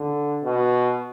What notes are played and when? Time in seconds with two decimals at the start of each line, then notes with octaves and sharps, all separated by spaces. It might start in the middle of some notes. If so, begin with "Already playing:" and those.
Already playing: D3
0.44 B2